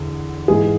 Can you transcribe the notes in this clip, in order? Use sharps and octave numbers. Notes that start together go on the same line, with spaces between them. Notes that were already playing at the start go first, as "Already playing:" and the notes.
Already playing: E2 D3
G#2 E3 G#4